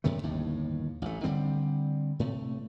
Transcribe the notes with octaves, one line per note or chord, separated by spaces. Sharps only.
F#2 C3 D#3 A3
G1 D#2 A2
A1 A3
D3 D#3 G3 C4
A2 C3 A3